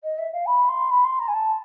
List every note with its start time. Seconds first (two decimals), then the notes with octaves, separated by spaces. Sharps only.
0.03 D#5
0.18 E5
0.32 F5
0.46 B5
0.68 C6
0.90 B5
1.04 C6
1.19 A#5
1.28 G#5
1.34 A5